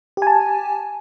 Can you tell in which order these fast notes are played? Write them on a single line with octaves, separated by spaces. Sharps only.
G4 G#5 A5